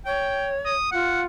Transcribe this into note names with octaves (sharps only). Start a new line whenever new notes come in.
C#5 G5
D#6
F4 F#5